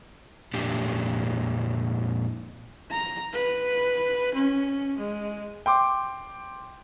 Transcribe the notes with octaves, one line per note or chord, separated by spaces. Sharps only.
F2 A#2 D4 G4
A#5
B4
C#4
G#3
G5 C6 D6